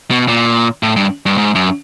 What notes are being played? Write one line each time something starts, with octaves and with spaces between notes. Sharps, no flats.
B2
A#2
A2
G2
G2
G#2
F#2